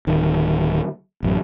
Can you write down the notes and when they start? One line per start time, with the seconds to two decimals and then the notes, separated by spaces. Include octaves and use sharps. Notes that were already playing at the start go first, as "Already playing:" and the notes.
0.07 D1 D#3
1.23 A1 F#2